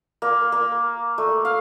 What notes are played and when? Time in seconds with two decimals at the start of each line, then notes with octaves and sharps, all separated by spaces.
0.22 A#3
0.52 A#3
1.18 A3
1.45 F5